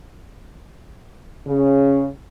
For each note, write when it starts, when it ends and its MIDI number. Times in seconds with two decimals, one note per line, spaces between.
1.47 2.07 49